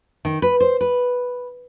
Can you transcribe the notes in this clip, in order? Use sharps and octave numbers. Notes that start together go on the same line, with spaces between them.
D#3
B4
C5
B4